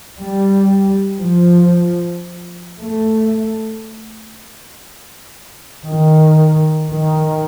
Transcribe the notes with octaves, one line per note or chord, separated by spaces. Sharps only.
G3
F3
A3
D#3
D#3